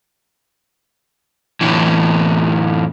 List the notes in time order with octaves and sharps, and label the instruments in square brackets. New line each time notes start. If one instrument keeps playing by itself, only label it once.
[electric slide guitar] A2 D3 E3